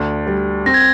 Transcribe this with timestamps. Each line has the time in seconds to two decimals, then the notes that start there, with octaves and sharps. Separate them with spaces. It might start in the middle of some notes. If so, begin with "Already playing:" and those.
Already playing: D2 D4
0.27 G3
0.66 C4 A#6
0.74 G#6